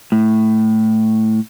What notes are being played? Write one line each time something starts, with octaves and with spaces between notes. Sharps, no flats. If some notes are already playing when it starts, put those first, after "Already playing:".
A2